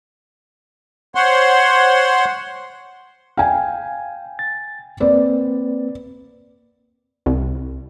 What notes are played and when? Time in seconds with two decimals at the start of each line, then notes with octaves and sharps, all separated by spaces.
1.15 C5 C#5 F#5 C6
3.37 F5 G5 G#5
4.39 A6
5.00 A#3 C4 B4 D5
7.26 C2